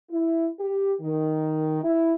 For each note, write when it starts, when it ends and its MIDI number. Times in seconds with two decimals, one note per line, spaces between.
0.10 0.46 64
0.59 0.93 67
1.01 1.79 51
1.82 2.13 64